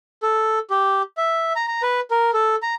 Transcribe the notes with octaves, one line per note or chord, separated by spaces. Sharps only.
A4
G4
E5
A#5
A#5
B4
A#4
A4
A#5